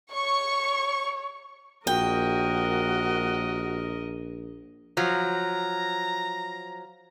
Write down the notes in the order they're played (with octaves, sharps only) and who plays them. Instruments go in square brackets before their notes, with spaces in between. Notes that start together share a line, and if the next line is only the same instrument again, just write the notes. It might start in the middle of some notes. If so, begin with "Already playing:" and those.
[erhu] C#5 [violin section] C#6
[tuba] A#1 [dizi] F#4 [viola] A#4 D#5 [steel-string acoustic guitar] G5
[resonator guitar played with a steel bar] F3 F#3 [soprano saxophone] A#5